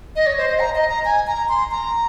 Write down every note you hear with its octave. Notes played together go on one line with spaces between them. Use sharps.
D#5
C#5
C5
D#5
A#5
D#5
A#5
G#5
A#5
C6
A#5